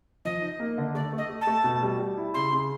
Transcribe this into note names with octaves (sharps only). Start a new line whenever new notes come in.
F3 D#5
D#4
A#3
D3
A3 D5
A3
D#5
A3
A5
A3
B2
G3
G3
E4
C#3 C6
C#3